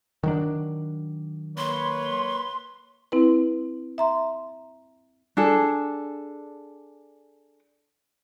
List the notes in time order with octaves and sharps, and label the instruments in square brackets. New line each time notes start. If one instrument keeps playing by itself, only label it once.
[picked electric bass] D#3 F#3 D4
[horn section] A#3 B4 C#5 [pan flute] C6
[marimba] C4 E4 B4
E5 A#5 C6
[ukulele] D4 G#4 A4